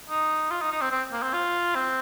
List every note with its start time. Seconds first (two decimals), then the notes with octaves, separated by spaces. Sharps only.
0.10 D#4
0.51 F4
0.61 D#4
0.72 D#4
0.81 C4
0.92 C4
1.13 A#3
1.23 C4
1.34 F4
1.75 C4